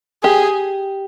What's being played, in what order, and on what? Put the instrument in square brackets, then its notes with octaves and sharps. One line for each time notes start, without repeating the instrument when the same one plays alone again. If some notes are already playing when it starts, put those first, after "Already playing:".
[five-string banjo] G4 [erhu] G#4